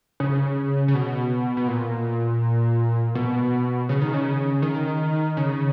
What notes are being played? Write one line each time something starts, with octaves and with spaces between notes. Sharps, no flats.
C#3
C#3
B2
B2
A#2
B2
C#3
D#3
C#3
D#3
C#3